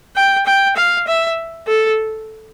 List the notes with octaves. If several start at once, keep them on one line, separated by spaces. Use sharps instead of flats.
G5
G5
F5
E5
A4